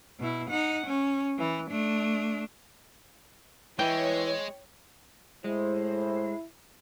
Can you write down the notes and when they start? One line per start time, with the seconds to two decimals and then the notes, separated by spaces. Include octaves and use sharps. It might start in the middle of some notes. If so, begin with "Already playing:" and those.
0.19 B2 E4
0.50 D#4 F#5
0.86 C#4
1.38 E3
1.69 A3 D4
3.79 E3 G#3 C#5 G5
5.44 A2 G#3 E4 C5